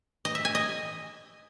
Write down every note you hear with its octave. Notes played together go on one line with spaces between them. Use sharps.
D#5
E5
G#5
D#5